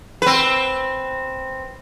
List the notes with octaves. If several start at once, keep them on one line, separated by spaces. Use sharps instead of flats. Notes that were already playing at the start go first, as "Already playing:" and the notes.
C4 B4